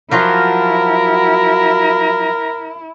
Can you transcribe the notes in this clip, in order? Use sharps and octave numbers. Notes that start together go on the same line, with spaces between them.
F3 F#3 E4 F4 A#4